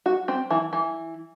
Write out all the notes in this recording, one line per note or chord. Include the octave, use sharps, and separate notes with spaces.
F#4
C4
E3
E3